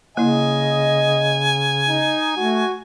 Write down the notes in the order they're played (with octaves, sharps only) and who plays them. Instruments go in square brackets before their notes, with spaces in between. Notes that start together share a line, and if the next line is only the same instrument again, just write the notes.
[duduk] C#3 [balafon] A#3 E4 [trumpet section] D#5 [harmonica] G#5
[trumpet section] D#4
[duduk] A3 [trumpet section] F#4